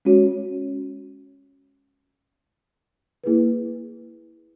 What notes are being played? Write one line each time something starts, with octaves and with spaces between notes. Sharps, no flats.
G#3 C#4 F#4 C#5
A#3 E4 G#4 B4